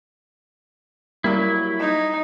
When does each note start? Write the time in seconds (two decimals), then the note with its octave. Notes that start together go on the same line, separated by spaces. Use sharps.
1.24 F#3 G3 A#3 E4
1.80 D#4